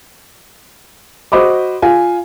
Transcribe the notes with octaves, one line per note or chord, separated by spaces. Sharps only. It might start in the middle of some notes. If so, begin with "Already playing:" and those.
F#4 C5 D#5 B5 D6
F4 G#5